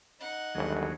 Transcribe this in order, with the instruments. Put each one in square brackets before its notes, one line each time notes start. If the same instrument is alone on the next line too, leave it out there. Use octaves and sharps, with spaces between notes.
[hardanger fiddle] D#4 F#5
[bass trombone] G1 [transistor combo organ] D#2 F#3 G#3